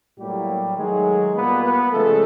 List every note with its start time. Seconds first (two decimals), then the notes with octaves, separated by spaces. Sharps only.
0.19 A2 F#3 G3 A#3 G4
0.77 D#3 F#3 G#3 A3 G#4
1.34 A#2 G3 A#3 B3 B4
1.63 B3 B4
1.91 C#3 F3 G#3 A3 A4